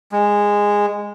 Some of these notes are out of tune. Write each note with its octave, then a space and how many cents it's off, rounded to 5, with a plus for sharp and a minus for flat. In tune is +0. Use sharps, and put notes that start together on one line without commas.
G#3 -15